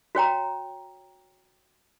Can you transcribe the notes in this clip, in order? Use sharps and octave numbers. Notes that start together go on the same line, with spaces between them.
F#4 C#5 G5 A#5